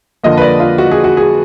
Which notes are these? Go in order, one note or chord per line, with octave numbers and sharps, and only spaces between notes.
F2 D3 F3 A#3 D#5
B4
D5
F4
F#4
G#4
F#4
G#4